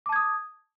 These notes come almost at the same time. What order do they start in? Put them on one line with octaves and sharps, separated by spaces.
D6 A5 G#6 D#6